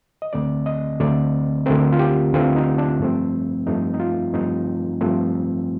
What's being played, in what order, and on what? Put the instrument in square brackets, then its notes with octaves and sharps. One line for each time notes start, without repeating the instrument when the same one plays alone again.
[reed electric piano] D#5
D2 D3 A3 C4 D5
D#5
D2 D3 A3 C4 D5
D2 D3 A3 C4 A#4
F4
G4
D2 D3 A3 C4 F4
D#4
D4
G2 F3 A3 C4
G2 F3 A3 C4 D#4
D#4
F4
G2 F3 A3 C4 D#4
G2 F3 A3 C4